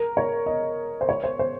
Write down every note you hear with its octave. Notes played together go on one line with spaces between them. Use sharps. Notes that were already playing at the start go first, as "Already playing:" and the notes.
Already playing: A#4
C#5
D#5
C5
C#5
C5
C5